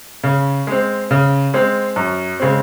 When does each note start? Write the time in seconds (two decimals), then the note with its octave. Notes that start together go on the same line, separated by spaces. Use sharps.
0.24 C#3
0.67 G#3 C4
1.11 C#3
1.54 G#3 C4
1.96 F#2
2.40 C#3 G#3 C4